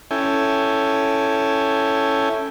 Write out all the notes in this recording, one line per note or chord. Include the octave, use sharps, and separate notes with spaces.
C#4 E4 A4 G5 G#5